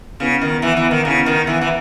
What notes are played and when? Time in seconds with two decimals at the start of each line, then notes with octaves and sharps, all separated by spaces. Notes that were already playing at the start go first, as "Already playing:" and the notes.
0.20 C#3 B3 E4 B4 F#5
0.42 D#3
0.62 E3 B3 E4 B4 F#5
0.77 E3
0.91 D#3
1.05 C#3 B3 E4 B4 F#5
1.26 D#3
1.47 E3 B3 E4 B4 F#5
1.61 E3